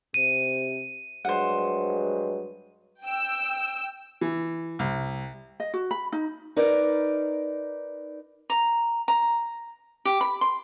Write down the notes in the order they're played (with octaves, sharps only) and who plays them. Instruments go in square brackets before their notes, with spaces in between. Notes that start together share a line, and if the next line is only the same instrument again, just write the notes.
[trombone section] C3 [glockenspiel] D#7
[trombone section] G2 F#3 G#3 [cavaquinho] C5 F#5
[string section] G5 E6
[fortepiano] E3
C2
[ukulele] D#5
F#4
B5
D#4
[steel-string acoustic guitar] D#4 A#4 B4 D5
[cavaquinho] A#5
A#5
G4
B5
C6